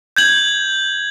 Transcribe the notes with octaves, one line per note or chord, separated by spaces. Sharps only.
G6 G#6 F#7